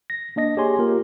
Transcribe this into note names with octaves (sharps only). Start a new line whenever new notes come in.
A#6
A#3 D4 D#5 A#6
G4 G#4 C#5 G#5 C6
A#3 F4 G4 A#4